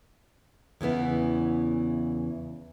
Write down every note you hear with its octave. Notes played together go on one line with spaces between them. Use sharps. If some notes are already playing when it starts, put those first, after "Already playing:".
E2 C#3 E3 B3 E4